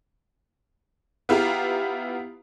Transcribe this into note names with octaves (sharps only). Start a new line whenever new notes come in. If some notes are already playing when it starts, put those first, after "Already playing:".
B3 E4 F4 G4 A#5